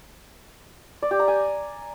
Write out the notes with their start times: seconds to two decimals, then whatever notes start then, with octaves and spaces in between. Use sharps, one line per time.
1.02 D5
1.11 G4
1.19 A#5
1.28 G#5